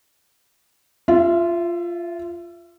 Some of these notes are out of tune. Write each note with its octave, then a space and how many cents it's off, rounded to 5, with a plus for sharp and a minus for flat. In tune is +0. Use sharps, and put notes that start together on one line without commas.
F4 -10 E5 +25